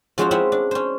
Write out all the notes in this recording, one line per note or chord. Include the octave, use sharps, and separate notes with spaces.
F3 G#3 C#4 F#4 C5 F5
C4 C#4 E4 E5 F#5
D4
C#4 C5